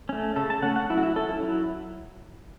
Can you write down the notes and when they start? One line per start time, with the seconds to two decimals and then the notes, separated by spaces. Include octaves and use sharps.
0.09 A3 C#4
0.36 C#3 A4
0.50 A5
0.62 A3 C#4 F#5
0.76 F#5
0.90 F#3 E4
0.98 F#4
1.03 E4
1.16 C#4 A4
1.29 E4
1.42 F#3 E4